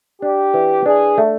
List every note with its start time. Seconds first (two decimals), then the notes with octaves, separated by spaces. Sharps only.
0.22 D4 G4
0.54 E3
0.86 D4 G#4
1.18 A3